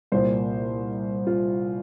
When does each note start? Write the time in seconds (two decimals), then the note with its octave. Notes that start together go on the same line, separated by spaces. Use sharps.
0.12 C2 A#2 C5
1.27 F4